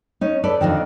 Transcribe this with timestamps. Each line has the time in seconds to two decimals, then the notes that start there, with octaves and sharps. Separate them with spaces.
0.21 C#4 D#4
0.44 A4 B4 D5
0.61 F2 B2 D3 D#3